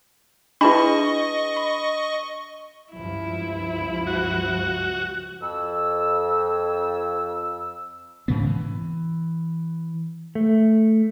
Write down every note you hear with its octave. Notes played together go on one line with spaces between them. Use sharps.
D4 E4 G#4 B4 D#5 A5 B5 C#6
B5
C#2 G2 F3 E4
F#4
F2 E6
G#2 C#3 B3
E3
A3